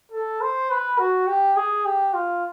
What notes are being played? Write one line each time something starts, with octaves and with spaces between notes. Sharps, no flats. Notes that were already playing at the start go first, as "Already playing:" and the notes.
A4
C5
B4
F#4
G4
G#4
G4
F4